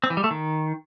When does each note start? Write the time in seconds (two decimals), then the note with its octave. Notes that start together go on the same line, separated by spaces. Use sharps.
0.04 C4
0.10 E3
0.17 G3
0.24 A3
0.31 D#3